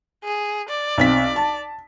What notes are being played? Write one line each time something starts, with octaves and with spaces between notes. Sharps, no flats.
G#4
D5
B1 C4 B6
A5